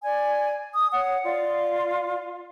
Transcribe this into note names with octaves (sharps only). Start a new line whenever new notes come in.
D5 G#5
D#6
C#5 F#5
F4 D5